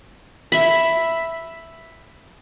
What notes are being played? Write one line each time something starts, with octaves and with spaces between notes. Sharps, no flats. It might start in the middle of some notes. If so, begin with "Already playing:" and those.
E5 B5